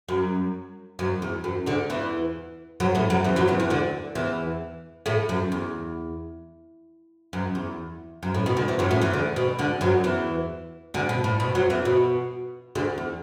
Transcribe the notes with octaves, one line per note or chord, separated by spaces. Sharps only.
F#2
F#2
E2
F#2
D2 D3
E2 E3
F#2 F#3
A2 A3
F#2 F#3
E2 E3
F#2 F#3
E2 E3
E2 E3
D2 D3
E2 E3
A2 A3
F#2
E2
F#2
E2
F#2
A2
B2
D2 D3
E2 E3
F#2 F#3
A2 A3
E2 E3
D2 D3
B2
D2 D3
F#2 F#3
E2 E3
D2 D3
B2
A2
B2
F#2 F#3
E2 E3
B2
D2 D3
E2